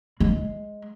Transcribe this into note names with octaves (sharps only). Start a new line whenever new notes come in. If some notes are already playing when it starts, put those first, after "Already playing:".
G#3